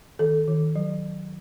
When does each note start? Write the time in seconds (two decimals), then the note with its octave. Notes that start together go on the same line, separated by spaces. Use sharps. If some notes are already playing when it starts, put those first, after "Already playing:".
0.19 D#3 A4
0.48 D#3
0.76 F#3